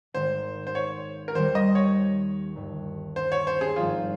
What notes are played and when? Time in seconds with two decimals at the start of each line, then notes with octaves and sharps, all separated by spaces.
0.14 G#1 G#2 D#3 C5
0.67 C5
0.75 C#5
1.28 A#4
1.35 D#2 D#3 G3 C5
1.55 D#5
1.75 C#5
2.55 G1 G2 D#3
3.16 C5
3.32 C#5
3.47 C5
3.61 G#4
3.76 G#1 G2 F3 C4 D#4 F4